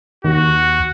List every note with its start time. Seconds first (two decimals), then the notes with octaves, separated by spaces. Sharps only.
0.25 D#2 F#4